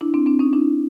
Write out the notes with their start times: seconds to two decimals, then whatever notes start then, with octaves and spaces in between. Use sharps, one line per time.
0.01 D4 E4
0.14 C4 D4
0.26 C4 D4
0.39 C#4 D#4
0.53 D4 E4